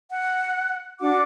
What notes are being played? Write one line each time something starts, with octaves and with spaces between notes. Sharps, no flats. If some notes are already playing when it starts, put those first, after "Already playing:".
F#5
D4 F#4 F#5 D6